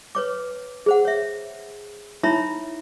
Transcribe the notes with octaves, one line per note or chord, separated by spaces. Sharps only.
B4 C#5 D6
G#4 C5 F#5
C#5 E5
D#4 E4 C#5 E5 A#5 B5